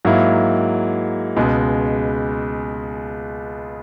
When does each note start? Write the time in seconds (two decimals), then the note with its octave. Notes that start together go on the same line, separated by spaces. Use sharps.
0.05 G#2 F#3 A#3 E4
1.37 C#2 B2 G#3